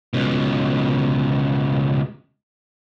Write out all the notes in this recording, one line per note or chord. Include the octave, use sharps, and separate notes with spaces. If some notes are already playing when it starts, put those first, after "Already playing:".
C#2 B2